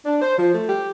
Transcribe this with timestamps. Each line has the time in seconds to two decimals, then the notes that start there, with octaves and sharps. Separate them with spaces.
0.05 D4
0.22 C5
0.38 F3
0.54 A3
0.69 G4